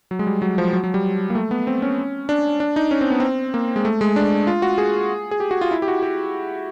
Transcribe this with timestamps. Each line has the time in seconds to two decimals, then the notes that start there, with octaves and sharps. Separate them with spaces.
0.11 F#3
0.19 G#3
0.27 G3
0.42 F#3
0.58 F3
0.73 F#3
0.84 F#3
0.94 G3
1.30 A#3
1.35 A3
1.51 B3
1.67 C4
1.82 C#4
2.29 D4
2.60 D4
2.76 D#4
2.91 C#4
3.01 C4
3.10 B3
3.20 C4
3.54 A#3
3.76 G#3
3.85 A3
4.01 G#3
4.16 D4
4.47 F4
4.62 F#4
4.78 G#4
5.31 G#4
5.40 G4
5.51 F#4
5.61 F4
5.71 E4
5.82 G4
5.88 F#4
6.03 G4